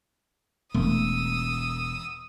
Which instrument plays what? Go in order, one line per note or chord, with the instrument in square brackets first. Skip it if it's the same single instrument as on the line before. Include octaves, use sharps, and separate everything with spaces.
[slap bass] E1 [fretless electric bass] A3 [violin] D#6 E6